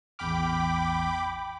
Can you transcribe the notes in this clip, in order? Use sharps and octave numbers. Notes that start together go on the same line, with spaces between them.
A1 E2 G5 B5 D6 F6